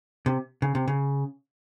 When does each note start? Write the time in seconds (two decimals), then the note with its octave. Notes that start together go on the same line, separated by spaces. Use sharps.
0.26 C3
0.62 C#3
0.75 C3
0.88 C#3